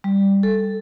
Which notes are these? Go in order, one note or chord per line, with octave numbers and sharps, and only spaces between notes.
G3
A4